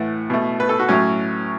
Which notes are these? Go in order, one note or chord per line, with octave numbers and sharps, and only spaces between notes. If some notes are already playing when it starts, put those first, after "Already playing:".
Already playing: A2 E3 A3 F#5
B2 A3
B4
A4
F#4
A2 F#3 A3 C#4